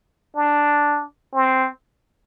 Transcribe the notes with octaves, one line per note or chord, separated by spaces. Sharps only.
D4
C4